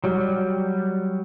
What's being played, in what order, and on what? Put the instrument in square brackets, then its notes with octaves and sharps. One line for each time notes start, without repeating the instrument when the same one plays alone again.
[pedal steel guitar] F#3 G3